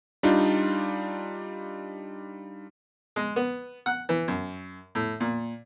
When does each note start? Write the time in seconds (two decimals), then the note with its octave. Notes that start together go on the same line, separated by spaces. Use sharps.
0.23 G3 D4 D#4 F4
3.16 G#3
3.36 B3
3.86 F#5
4.09 E3
4.28 F#2
4.95 A2
5.20 A#2